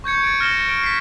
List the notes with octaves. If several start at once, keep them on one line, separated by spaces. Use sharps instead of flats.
C#6 G6 G#6 C#7
A6 C#7 D7
F6 A#6 E7 G7
A6 D7
B6 C7